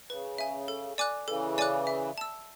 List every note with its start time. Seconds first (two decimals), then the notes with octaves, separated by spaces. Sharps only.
0.10 C#3 B4
0.38 E5 G#5
0.68 A4
0.98 D5 G#5 D6 F#6
1.28 C#3 E3 A4
1.58 D5 G#5 D6 F#6
1.87 E5
2.18 A5 E6